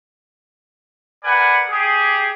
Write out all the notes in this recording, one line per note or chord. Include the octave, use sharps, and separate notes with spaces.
A#4 B4 D5 F#5 G#5
G4 G#4